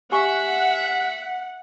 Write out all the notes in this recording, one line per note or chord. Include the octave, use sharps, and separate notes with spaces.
G4 E5 F#5 G#5 C#6